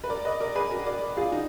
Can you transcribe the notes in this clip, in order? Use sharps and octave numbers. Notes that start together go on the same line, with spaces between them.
B4
A#4 D5
B4 D#5
A#4 D5
G#4 B4
F#4 A#4
A#4 D5
F4 G#4
D#4 F#4